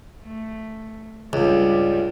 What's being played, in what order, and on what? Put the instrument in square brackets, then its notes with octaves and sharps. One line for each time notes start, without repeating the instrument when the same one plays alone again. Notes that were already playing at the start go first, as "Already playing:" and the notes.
[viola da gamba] A3
[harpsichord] C#2 [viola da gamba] G2 G3